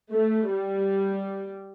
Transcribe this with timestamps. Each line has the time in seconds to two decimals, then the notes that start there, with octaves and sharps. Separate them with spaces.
0.13 A3
0.52 G3